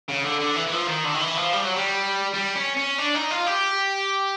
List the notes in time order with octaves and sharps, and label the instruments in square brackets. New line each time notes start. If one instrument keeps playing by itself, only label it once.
[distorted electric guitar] C#3
D3
D3
E3
E3
F3
D#3
D3
D#3
E3
F3
G3
F#3
G3
G3
C#4
C#4
D4
D#4
F4
G4